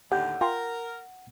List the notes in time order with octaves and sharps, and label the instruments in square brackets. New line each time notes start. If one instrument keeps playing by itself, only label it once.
[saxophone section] D#2 A2 D3 [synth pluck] G4 [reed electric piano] F#5 G6
[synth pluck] F4 G5 C6 [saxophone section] A#4